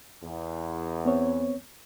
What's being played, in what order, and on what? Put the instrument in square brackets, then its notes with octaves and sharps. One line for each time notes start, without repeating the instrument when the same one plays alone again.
[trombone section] E2
[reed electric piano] B3 C4 C#5